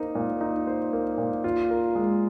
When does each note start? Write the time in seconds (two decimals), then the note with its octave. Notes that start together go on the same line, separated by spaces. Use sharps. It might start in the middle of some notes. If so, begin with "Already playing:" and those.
Already playing: A#3 D#4 C5
0.15 A#2
0.41 D#4
0.67 C5
0.93 A#3
1.18 A#2
1.44 F4
1.70 A#4
1.95 G#3